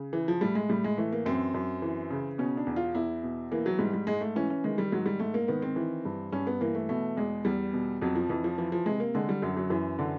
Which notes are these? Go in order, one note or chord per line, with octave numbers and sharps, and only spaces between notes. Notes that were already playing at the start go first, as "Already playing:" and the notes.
Already playing: C#3
E3
F3
A2 G3
G#3
A2 G3
G#3
E3 A3
A#3
F#2 C4
F#2
E3
C#3
B2 C#4
D4
E2
F4
E2 E4
B2
E3 A#3
F#3
G#2 G3
G3
G#2 G#3
A3
E3 C#4
C#4
D#3 G#3
G3
G#2 F#3
G3
G#2 A3
A#3
D#3 B3
C4
E3
G2
G2 C#4
B3
E3 A#3
A3
B2 A3
E2 G#3
E2 G3
B2
F2 F#3
F3
F2 E3
F3
E3 F3
F3
C3 G#3
A#3
D3 G#3
G3
F#2 F#3
F#3
F#2 E3
D3